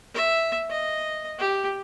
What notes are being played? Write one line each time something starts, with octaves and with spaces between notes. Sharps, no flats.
E5
D#5
G4